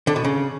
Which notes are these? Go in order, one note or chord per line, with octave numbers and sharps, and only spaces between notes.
D3
B2
C#3